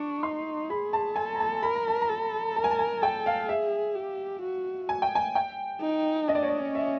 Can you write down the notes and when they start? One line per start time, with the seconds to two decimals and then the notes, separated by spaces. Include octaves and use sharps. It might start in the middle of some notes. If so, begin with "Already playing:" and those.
Already playing: D4 C#6
0.23 D#4 C6
0.70 G#4 B5
0.93 A5
1.16 A4 G#5
1.35 A#5
1.40 A5
1.63 A#4 B5
1.75 A#5
1.88 A5
2.01 A#5
2.09 A4
2.56 A#4 A5
2.64 G#5
2.71 A5
2.79 G#5
3.02 A4 G5
3.26 F5
3.49 G#4 E5
3.95 G4
4.42 F#4
4.89 G#5
5.02 G5
5.15 G#5
5.35 G5
5.82 D#4
6.28 D4 D#5
6.35 D5
6.43 C#5
6.49 D5
6.59 C#4
6.75 E5